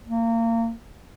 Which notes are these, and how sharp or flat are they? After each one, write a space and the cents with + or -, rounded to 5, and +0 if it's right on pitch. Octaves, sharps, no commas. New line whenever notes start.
A#3 -30